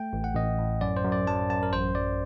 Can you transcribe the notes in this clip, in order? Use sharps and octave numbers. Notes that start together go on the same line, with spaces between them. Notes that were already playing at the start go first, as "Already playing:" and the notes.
Already playing: A3 G5
A1
F#5
A1 D#5
A2
F#2 D5
C5
F#2
D5
F#3 A5
F#2 A5
A#4
A1 C5
F#3 D5